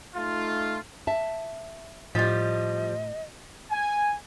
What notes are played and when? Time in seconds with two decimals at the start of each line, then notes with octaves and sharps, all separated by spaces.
0.16 A3 D#4 F4
1.07 E5 A5
2.15 A2 F3 G3 D#5
3.71 G#5